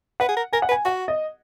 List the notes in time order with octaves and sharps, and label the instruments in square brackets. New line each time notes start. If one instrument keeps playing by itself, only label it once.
[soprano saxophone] B4 [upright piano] F#5
[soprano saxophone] G#4
A#4
[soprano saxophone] A#4 [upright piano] G#5
[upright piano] F#5
[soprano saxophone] B4
[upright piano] G#5
[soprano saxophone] F#4 [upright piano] F#5
[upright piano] D#5